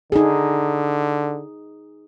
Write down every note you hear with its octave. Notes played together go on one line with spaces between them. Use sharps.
D3 D#4 G#4